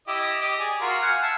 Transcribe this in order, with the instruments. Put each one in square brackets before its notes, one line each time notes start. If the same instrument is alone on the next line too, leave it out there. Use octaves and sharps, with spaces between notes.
[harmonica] E4 G4 D#5
G4 D#5
G#4 D5
F4 F#4 A#4
F5 F#5 G#5
E5 A5